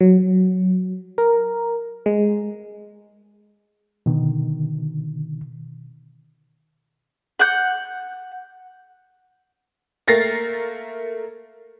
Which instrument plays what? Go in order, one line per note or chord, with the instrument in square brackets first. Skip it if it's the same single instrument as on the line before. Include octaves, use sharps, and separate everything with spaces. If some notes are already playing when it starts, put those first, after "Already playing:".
[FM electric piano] F#3
A#4
G#3
[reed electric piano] B2 D3 D#3
[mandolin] F#5 G6
[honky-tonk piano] A3 A#3 A#4 A6 A#6 C7